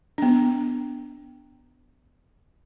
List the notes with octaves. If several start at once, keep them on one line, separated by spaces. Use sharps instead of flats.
B3 D4